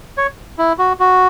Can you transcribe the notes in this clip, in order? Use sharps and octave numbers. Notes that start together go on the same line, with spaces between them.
C#5
E4
F#4
F#4